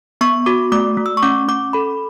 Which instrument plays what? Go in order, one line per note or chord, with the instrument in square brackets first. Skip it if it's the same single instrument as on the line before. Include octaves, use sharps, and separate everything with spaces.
[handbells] B3 C#6
F#4 D6
A3 D6
A3
E6
C#6
C#4 D6
C#4 D6
A4 B5